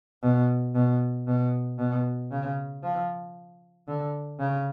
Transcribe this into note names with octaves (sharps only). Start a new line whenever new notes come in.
B2
B2
B2
B2
C#3
F3
D3
C#3